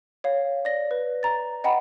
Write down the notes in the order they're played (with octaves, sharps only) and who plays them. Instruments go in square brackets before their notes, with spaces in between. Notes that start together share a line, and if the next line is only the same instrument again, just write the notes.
[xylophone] C#5 F5
D5 A#6
B4
A#5 A6
D#5 F#5 G5 A#5 B5